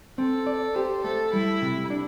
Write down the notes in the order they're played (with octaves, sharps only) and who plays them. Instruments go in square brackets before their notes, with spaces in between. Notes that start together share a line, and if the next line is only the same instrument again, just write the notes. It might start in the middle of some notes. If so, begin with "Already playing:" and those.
[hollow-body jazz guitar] C4 [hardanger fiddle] A4
[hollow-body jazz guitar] D5
[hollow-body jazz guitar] G4 [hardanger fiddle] C5
[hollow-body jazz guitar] A3 [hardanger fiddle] A4
[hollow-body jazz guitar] G3 [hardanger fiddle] E4
[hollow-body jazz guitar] C3
D4